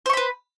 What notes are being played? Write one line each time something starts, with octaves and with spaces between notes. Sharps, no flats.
B4 C5 B5 C#6